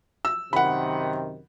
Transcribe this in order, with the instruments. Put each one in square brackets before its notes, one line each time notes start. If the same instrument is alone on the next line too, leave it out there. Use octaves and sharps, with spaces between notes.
[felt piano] E6
[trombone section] F#2 C3 D#3 [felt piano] F#5 B5